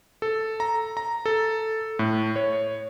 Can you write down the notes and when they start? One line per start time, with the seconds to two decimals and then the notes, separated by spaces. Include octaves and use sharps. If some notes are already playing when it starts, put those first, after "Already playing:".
0.22 A4
0.60 A#5
0.97 A#5
1.26 A4
1.99 A2
2.36 C#5